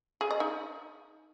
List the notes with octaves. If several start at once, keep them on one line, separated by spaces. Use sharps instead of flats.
G#4
D#5
D#4